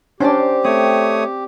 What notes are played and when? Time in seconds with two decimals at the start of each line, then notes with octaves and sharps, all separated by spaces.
0.20 C#4 D4 G4 C5 D5
0.64 A3 C4 C#5 D#6